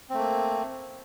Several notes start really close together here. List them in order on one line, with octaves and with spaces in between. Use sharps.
C4 A3 A#3